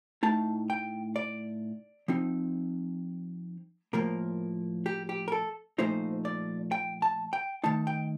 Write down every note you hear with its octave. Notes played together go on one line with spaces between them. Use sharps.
A2 A3 D#4 A5
G5
D5
F3 C4 D#4
A2 F3 A#3 A#4
G4
G4
A#4
A4
A#2 F3 A3 D#4 C5
D5
G5
A5
G5
D#3 A3 D#4 A5
G5